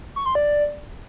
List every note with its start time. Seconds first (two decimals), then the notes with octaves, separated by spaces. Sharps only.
0.16 C#6
0.26 C6
0.35 D5